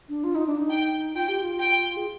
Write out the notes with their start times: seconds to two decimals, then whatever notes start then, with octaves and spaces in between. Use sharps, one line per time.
0.09 D4
0.24 F4
0.35 D#4
0.46 D4
0.57 D#4
0.70 G5
1.14 F4 G5
1.28 G4
1.42 F4
1.60 G5
1.97 G#4